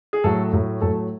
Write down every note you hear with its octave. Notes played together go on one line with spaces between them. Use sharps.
G#4
A2 F#3 A3 A4
A2 F#3 A3
A2 F#3 A3 A4